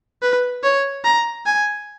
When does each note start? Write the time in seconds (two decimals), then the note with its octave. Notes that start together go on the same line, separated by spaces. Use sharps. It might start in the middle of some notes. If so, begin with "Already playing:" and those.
0.22 B4
0.63 C#5
1.05 A#5
1.46 G#5